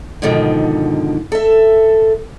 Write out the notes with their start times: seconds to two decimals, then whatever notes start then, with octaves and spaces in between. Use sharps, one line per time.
0.22 G#2 B2 D3 D#3 F3
1.32 A4 E5